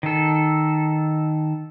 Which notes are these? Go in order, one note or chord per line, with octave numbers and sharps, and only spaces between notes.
D#3 A4